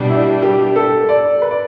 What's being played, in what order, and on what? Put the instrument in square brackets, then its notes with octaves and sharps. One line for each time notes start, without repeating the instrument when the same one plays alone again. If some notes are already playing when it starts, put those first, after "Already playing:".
Already playing: [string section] B2 G3 D4
[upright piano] E4
G4
A4
D5
B4
D5